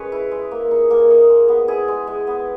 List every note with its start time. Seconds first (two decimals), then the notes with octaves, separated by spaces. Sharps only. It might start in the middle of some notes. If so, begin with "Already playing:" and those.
Already playing: G#3 C#4 B4 C#5
0.12 E4
0.31 G#3
0.51 A#3
0.71 D#4
0.90 A#3 A#4
1.10 D#4
1.29 G#3
1.48 B3
1.68 E4 G#4
1.88 G#3
2.07 G#3
2.27 B3